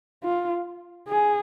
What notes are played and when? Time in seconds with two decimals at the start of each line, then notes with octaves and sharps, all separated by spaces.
0.24 F4
1.08 G#4